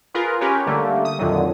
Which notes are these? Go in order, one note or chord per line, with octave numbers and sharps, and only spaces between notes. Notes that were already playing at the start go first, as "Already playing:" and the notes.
F4 G#4 A#4 B4
C#4 G4 A#4 B4 C#5
D3 G3 A3 A#3
D#6
F2 A#2 D3 D#3 F#3